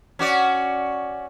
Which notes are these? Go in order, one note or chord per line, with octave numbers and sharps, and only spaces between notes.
C#4 F#4 D5